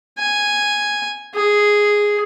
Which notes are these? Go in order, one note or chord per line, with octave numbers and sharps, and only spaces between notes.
G#5
G#4